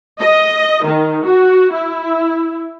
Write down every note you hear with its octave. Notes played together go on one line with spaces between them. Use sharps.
D#5
D#3
F#4
E4